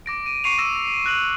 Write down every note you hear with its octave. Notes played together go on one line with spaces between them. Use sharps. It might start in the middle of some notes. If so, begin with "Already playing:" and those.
D6 A#6 D7
D7 D#7
C#6 C7 C#7 D#7 F7
E6 A#6 C#7 E7
D7
F#6 A#6 F#7